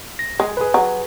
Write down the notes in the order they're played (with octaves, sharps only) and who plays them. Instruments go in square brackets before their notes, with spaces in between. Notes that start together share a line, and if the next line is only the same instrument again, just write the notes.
[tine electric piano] A#6
[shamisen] G#3 [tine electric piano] G#4
[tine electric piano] G#4 B4
[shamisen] F#3